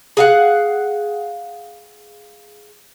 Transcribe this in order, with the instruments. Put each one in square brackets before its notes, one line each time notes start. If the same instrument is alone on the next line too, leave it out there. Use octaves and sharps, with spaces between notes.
[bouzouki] G#4 F5 F#5